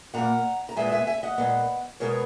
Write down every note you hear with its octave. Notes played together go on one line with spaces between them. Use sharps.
A#2 A#3 F#5 A#5
A#5
A#2 G#3 B3 E5 G#5
E5 G#5
E5 G#5
D#5 F#5
A#2 G#3 B3
B2 G#3 B3 A#4 C#5